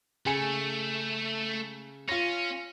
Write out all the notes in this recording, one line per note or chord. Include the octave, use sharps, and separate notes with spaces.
C#3 A3 G#5 C#7
C#4 F4 A#6